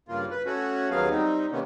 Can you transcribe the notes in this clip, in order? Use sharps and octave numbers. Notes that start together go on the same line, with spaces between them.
G2 C#3 A#3 F4
B4
A3 C#4 F#4
D#2 F#3 B3 G#4 F5
G3 C4 D#4
C3 D#3 A#3 B3 C#4